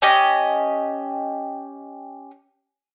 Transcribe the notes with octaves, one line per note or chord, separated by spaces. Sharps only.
C#4 G4 D#5